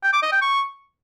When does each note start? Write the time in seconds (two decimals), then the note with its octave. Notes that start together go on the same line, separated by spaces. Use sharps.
0.03 G5
0.13 D6
0.22 D#5
0.32 G5
0.42 C#6